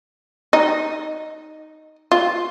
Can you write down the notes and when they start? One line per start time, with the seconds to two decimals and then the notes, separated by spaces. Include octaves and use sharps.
0.53 D#4
2.12 F4